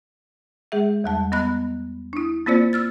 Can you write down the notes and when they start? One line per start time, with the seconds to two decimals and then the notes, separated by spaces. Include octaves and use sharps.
0.72 G#3 G#4 E5
1.04 E2 G3 A5
1.32 B3 D#5 B5 F#6
2.13 D4 E4
2.46 A#3 C4 F4 C5 D5
2.73 E6 F6 A6